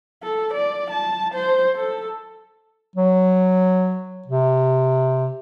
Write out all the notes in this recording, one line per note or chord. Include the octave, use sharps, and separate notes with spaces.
A4
D5
A5
C5
A4
F#3
C3